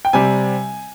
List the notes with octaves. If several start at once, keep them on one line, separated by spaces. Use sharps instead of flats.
G5
C3 G3 C4 G#5